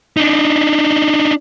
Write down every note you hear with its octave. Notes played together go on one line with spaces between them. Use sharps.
D4 D#4